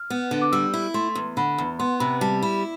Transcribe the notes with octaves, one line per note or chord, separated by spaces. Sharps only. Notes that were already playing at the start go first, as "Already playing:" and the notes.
Already playing: F6
B3
D3
D6
G3 E6
E4
A3 C6
E2
D3 B5
E2
B3 C6
C3 B5
G3 A5
E4 B5